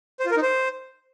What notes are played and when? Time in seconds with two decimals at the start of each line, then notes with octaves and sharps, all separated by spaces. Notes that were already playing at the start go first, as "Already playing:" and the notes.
0.20 C5
0.25 F4
0.31 A#4
0.37 D#4
0.42 C5